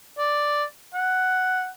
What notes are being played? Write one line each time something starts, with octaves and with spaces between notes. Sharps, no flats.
D5
F#5